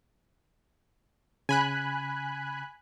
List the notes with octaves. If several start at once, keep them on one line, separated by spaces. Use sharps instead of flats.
C#3 G#5 B5 F#6